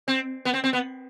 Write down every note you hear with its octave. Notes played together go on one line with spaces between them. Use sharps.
C4
B3
C4
C4
B3